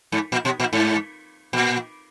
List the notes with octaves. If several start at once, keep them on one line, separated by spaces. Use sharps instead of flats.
G#2
A#2
B2
A#2
G#2
A#2